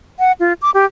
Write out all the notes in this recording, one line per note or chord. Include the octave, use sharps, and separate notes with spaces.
F#5
F4
D6
G4